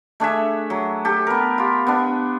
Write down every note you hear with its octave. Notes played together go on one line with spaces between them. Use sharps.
A3 D4 G#4 E5
F#3
G4 A4
B3 A#4
F4 G4
B3 D4